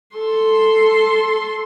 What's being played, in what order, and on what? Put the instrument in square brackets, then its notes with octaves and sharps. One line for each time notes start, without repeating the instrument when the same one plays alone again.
[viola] A4 C6